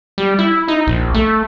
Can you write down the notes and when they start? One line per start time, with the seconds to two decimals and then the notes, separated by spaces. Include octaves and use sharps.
0.18 G3
0.39 E4
0.68 D#4
0.87 A#1
1.14 A3